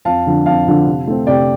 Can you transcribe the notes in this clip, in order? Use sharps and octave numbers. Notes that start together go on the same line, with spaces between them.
F2 F5 A5
D3 F3 D4
F2 F5 A5
D3 F3 D4
C3
A3 C4
C3 D5 G5